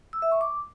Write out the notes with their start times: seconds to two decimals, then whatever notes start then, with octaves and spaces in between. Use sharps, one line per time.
0.13 E6
0.22 E5
0.32 C#6
0.41 D6